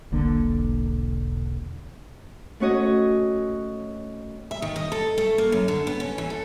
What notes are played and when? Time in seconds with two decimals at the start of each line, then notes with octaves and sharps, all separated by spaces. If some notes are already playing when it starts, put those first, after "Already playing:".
0.12 E1 B1 D3 A#3
2.60 A3 C#4 F#4 C#5 D#5
4.51 E5
4.62 D#3
4.76 D#5
4.92 A4
5.18 A3
5.38 A#3
5.52 F#2
5.68 D3
5.87 B3
6.00 C#4
6.18 E3
6.30 A4